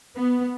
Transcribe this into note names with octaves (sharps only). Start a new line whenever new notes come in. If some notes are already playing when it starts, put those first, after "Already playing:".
B3